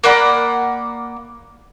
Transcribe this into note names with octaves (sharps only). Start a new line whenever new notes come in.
A#3 D5 F#5 B5